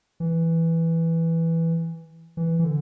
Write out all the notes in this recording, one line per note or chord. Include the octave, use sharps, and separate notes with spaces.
E3
E3
E3
D3